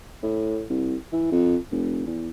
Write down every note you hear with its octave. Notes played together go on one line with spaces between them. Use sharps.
A2
C2
E3
F2
F1
E2